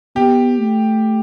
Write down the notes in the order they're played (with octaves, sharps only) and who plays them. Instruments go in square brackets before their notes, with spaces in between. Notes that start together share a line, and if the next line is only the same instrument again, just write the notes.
[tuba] B3 [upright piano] G4
[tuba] A3